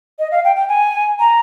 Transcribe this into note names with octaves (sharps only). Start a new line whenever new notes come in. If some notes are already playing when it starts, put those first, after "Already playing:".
D#5
F5
G5
G5
G#5
A#5